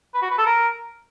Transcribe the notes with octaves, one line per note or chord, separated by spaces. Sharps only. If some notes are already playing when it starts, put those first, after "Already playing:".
B4
F#4
B4
A4
A#4